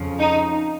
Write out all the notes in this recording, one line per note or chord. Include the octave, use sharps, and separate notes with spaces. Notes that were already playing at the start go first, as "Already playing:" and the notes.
Already playing: F2 C#3 F3
D#4